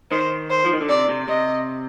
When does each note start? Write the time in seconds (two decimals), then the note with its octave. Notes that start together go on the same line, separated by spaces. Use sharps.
0.11 D#3 C5
0.50 C5
0.65 F3
0.73 D#3
0.81 D3
0.89 C3 D5
1.09 C3
1.28 C3 D#5